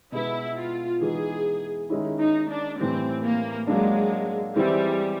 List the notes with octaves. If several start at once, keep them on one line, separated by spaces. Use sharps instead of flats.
B2 G#3 B3 E4
F4
E3 G#3 B3 D#4 G#4
D#3 G#3 C#4 E4
D#4
D4
A2 E3 G3 C4
A#3
F#3 G#3 A#3 D4
E3 G3 G#3 C4 E4